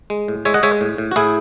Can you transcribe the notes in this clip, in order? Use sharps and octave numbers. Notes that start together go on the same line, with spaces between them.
G#3
A2
G#3 C#5 E5
D#5 F#5
G#3 C#5 E5
A2
A2
F#4
A2 E4 G#4